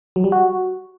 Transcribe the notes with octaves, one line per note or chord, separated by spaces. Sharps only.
F#3
G3
F#4